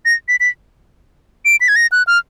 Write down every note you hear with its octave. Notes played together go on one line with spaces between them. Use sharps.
A#6
B6
B6
D7
B6
G#6
A#6
F#6
F6